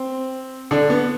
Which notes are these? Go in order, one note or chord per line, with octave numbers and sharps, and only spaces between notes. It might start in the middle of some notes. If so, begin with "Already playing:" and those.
Already playing: C4
D3 D4
B3